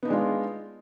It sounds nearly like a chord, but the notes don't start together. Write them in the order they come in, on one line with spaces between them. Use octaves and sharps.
B3 D#4 D4 G#3 F4